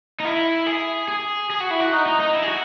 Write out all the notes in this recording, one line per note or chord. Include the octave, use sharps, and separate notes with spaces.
D#4
E4
G#4
G#4
G#4
F#4
E4
F#4
D#4
D#4
D#4
E4
G#4
F#4